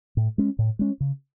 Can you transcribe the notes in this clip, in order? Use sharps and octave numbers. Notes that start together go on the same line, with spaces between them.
A2
G#3 C#4
A2
G#3 C#4
C#3